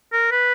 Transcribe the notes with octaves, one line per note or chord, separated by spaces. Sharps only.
A#4
B4